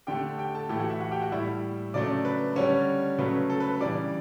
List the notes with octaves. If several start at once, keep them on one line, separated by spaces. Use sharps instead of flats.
D3 A3 G4 G5
G4 G5
A4 A5
A2 E3 A3 G4 G5
F#4 F#5
E4 E5
F#4 F#5
G4 G5
F#4 F#5
A2 G3 E4 E5
C#3 F#3 A3 D4 D5
B4
D3 G3 C#4 C#5
C#3 F#3 A3 B4
A4
B4
B4
C#3 E3 G3 D4 D5